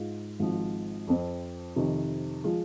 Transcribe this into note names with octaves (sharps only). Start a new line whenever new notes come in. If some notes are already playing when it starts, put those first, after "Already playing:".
Already playing: G#2 G#3 F4
G#1 G#2 F3
F2 F3 C4
F2 C3 D#3
F3 G#3 F4